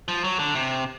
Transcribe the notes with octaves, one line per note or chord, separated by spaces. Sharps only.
F3
F#3
D3
C3